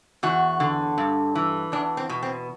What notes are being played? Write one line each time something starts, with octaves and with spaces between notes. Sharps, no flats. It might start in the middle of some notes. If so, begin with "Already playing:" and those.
E2 F#4
D3
G2
E3
E2 D4
C4
B2
C4